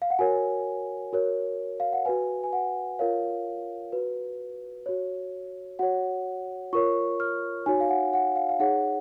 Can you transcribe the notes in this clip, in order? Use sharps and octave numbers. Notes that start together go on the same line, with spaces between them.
F5
F#5
F#4 A#4 C#5 G#5
F#4 A#4 C#5
F5
F#5
F#4 B4 G#5
G#5
F#5
F4 A#4 C#5 F5
F#4 B4
F#4 C#5
F#4 C#5 F#5
F4 A#4 C#5 C#6
F6
D#4 F#4 C#5 G#5
F5
F#5
F#5
F5
F5
D#4 G#4 C#5 F#5